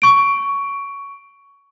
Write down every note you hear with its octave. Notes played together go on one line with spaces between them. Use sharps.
C#6 D7